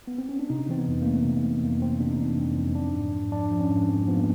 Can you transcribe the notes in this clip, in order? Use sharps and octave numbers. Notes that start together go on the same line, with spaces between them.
B3
C4
C#4
D4
C3 D#4
E3 C4
B3
F2
A#3
F2 A3
C3
E3
F2 A#3
F2 C4
C3 D4
D#4
E3 D4
F2
F2
F3 D4
G#2
G#2
F3 D4
F3
C#4
G#2
G#2 C4
F3 B3
A#3